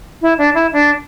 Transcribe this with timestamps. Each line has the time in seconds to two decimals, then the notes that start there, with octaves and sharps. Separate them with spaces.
0.22 E4
0.38 D4
0.55 E4
0.73 D4